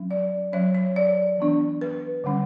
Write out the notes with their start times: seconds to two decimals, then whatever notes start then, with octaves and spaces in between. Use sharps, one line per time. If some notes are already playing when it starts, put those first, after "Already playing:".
Already playing: F#3 C#4
0.11 D5
0.52 F#3 C#4 C#5
0.75 C#5
0.96 D5
1.38 E3 B3 D4
1.81 B4
2.24 D3 G3 C#4